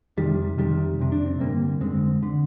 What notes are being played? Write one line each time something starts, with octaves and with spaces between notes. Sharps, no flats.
F2 C3 D#3 G3
F2 C3 D#3 G3
F2 C3
D4
C4
G2 D3 G3 A#3
F2 D3 G#3 C4
D3